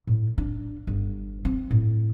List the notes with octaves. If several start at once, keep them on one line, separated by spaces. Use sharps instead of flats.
A2
D4
G1
C4
A2